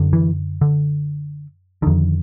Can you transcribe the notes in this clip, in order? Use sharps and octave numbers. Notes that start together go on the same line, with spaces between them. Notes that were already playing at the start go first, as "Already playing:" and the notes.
Already playing: F#2 D3
E3
D3
F2 D3 D#3